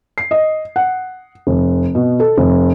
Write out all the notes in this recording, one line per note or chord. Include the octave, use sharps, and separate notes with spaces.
C7
D#5
F#5
F1
B2
A4
F1